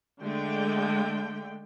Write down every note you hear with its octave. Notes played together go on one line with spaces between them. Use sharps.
D3 G#3 A3 G5